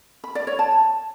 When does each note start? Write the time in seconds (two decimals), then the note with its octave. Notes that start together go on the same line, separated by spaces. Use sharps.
0.24 B5
0.35 D5
0.47 C#5
0.59 A5